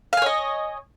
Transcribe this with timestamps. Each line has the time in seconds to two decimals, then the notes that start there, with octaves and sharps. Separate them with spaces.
0.13 F5
0.17 G#5
0.22 C#5
0.26 D#5